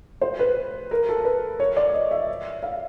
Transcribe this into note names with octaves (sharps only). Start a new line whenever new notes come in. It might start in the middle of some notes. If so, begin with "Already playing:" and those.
C5
B4
A#4
A4
B4
C#5
D5
D#5
E5
F5